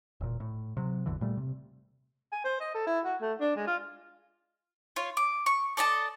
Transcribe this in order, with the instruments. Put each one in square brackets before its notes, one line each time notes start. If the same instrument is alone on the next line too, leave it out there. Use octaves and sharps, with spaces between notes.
[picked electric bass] E1 A#2
A2
C3 F#3
G#1 E2 D3 E3
A#2 G3 A3
C3
[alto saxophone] G#5
C5
D#5
A4
E4
F#4
A3
D4
G#3
F4
[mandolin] F4 C#5
D6
C#6
A4 D5 D#5 A5